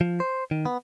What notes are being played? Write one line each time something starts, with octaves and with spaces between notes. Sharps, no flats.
F3
C5
D#3
B3